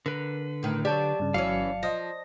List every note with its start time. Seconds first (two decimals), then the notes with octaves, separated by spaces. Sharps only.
0.06 D3 A#4 B4
0.63 A2 D#3
0.85 F#3 G4 D5 A5
1.19 G2 C#3
1.34 G1 E3 F#3 C#4 F5 C#7
1.83 F3 D#5 A#6